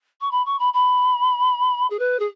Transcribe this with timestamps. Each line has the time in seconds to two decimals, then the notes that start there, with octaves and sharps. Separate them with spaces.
0.21 C#6
0.31 B5
0.46 C#6
0.59 B5
0.74 B5
1.90 G#4
1.99 B4
2.19 G#4